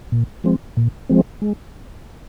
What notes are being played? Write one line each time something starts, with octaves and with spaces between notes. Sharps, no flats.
A#2
F3 G#3 C4
A#2
F3 G#3 C4
G#3